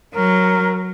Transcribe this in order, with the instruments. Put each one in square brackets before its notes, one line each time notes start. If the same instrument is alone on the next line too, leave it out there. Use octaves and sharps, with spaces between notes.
[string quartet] F#3 [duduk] A#4